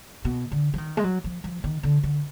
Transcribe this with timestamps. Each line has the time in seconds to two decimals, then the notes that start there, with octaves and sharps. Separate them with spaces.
0.25 B2
0.52 D3
0.74 F3
0.78 D#3
0.97 G#3
1.04 F#3
1.24 F3
1.44 F3
1.64 D#3
1.83 D3
2.03 D3